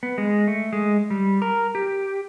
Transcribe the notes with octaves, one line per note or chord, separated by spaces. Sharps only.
B3
G#3
A3
G#3
G3
A#4
G4